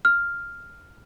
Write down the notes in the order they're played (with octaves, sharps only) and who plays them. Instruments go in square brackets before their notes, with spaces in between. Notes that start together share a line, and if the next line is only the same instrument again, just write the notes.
[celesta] F6